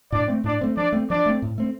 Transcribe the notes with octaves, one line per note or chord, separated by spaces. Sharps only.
A2 D4 D5
A3 C4
A2 D4 D5
A3 C4
F3 D4 D5
A3 C4
F3 D4 D5
A3 C4
A2
A3 C4